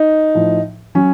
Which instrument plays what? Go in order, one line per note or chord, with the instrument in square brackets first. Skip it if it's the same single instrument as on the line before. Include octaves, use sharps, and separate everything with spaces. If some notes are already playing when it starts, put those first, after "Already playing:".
Already playing: [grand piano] D#4
A2 F3
F#3 C#4